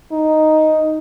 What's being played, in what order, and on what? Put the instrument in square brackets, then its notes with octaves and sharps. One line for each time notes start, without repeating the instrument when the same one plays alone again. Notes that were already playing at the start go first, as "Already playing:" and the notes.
[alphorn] D#4